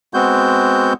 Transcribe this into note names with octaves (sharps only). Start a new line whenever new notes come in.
G#3 B3 C4 F#4 G6